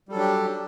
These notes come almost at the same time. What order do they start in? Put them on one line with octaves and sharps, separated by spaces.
G3 A4 F#3 D4 G4